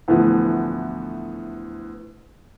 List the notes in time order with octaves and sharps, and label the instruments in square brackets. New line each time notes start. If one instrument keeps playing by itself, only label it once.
[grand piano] D2 A2 E3 F3 A3 B3